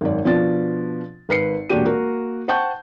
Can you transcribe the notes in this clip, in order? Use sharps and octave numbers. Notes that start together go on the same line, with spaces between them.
G#1 F#2 D5
B2 F3 D4 F4 A6
G#1 B4 C7 C#7
E1 A#2 D4 F#4 G4 D#7
A#3 F#4 A#4
C5 F#5 G5 A5 C#6 G6